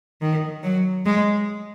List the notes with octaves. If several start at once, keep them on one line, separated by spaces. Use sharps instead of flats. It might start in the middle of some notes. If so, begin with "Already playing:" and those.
D#3
F#3
G#3